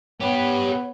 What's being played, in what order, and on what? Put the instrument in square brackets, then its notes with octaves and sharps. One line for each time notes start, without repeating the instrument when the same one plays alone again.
[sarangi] B3 [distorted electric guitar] G4 B4 [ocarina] C#5